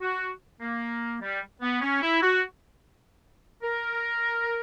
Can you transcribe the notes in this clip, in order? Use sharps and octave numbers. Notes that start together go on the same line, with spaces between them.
F#4
A#3
G3
B3
C#4
E4
F#4
A#4